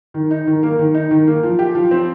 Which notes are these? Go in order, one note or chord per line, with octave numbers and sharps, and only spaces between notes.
D#3
D#4
D#3
A#3
D#3
D#4
D#3
A#3
F3
G4
F3
C4